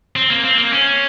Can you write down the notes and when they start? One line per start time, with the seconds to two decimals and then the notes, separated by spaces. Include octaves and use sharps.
0.16 C4
0.30 A#3
0.44 C4
0.58 A#3
0.72 C#4